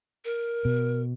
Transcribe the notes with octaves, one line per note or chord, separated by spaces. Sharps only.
A#4
B2